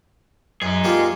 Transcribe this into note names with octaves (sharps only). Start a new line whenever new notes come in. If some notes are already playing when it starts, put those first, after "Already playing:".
F#2 D#4 G#4
G3 A#3 F4